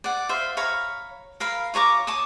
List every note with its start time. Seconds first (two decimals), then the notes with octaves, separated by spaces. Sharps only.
0.04 D5 F#5
0.29 C5 E5 F5
0.57 C#5 F5 A#5 B5
1.40 A#4 F5 B5
1.74 F4 C#5 A#5 D6
2.07 C#5 A5 D6 D#6